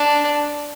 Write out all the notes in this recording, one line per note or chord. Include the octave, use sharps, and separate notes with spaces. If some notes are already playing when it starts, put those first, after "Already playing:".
Already playing: D4